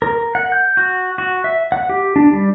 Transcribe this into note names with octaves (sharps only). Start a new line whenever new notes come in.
A#4
F#5
G6
F#4
F#4
E5
F#5
G4
D4
G3